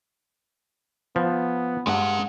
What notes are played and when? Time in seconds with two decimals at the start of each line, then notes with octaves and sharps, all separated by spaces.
1.16 F3 B3
1.87 G2 G#3 F#5